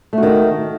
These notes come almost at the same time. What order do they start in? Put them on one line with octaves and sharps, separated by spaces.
A3 F#4 D#3